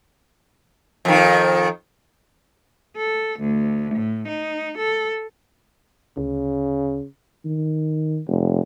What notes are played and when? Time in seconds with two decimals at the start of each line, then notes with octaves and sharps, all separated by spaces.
1.05 F2 D#3
2.97 A4
3.40 D2
3.95 A2
4.28 D#4
4.78 A4
6.17 D2 C#3
7.45 D#3
8.27 F1